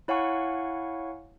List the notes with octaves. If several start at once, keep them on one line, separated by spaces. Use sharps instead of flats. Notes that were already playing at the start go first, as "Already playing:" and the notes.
E4 C#5 F5 F#5 G#5 C#6